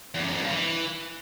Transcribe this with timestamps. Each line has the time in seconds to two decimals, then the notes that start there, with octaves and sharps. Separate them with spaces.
0.14 E2
0.24 F#2
0.33 F2
0.42 G2
0.51 E3